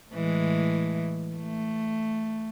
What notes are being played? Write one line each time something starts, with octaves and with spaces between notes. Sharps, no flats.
A2 E3 G#3
A3